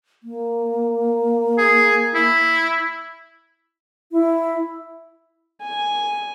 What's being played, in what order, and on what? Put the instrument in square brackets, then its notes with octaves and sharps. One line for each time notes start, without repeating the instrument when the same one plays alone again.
[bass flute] A#3
[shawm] G#4
E4
[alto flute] E4
[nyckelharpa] G#5